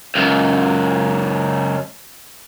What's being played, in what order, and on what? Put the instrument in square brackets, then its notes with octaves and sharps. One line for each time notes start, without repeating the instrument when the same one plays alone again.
[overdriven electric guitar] C#2 F#2